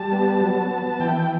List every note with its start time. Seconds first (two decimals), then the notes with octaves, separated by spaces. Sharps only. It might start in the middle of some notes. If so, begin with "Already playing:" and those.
Already playing: G3 A5
0.12 B3
0.41 F#3
0.71 B3
1.00 E3 G5